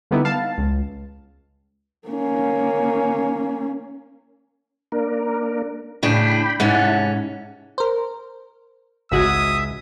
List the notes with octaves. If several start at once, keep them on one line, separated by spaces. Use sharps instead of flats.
D3 G3 B3 D#4 E4
F5 A5
C#2
A#3 C#4
A#3 D4 A#4
A2 C#3 D4 G5 B5
G#2 C3 C#4 E4 F#5 A5
A#4 C5
G#1 C#2 G#3 F#4 E5 D#6 G#6